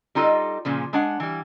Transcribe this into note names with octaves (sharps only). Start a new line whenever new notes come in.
G3 D#4 F4 A4 D#5
A#2 C#3 F3
G#3 D4 F#5
E3 G3